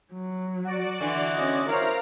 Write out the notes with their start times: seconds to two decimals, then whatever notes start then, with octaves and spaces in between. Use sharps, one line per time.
0.13 F#3
0.65 F#4 D5
1.01 D3 E3
1.35 C#4 D#5
1.69 E4 A#4 C5 C#5 F5 A#5